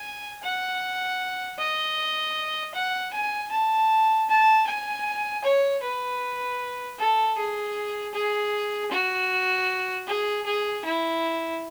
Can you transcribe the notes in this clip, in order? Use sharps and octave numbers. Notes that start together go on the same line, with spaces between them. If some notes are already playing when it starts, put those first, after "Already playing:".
Already playing: G#5
F#5
D#5
F#5
G#5
A5
A5
G#5
C#5
B4
A4
G#4
G#4
F#4
G#4
G#4
E4